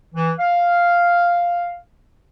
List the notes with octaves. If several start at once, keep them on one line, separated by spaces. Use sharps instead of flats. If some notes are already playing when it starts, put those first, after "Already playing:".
E3
F5